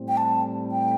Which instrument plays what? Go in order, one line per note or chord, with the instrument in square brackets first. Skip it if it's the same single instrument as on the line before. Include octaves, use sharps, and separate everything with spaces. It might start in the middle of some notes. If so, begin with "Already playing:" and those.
Already playing: [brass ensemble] A2 G3 C4
[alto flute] G5
A5
G5